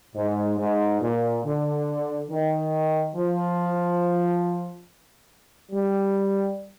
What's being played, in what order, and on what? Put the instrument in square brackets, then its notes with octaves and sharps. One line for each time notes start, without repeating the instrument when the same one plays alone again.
[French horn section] G#2
G#2
A#2
D3
D#3
F3
G3